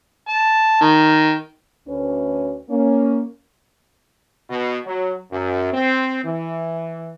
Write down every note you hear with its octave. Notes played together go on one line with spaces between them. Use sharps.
A5
D#3
D2 C#4 B4
A#3 C#4
B2
F#3
F#2
C4
E3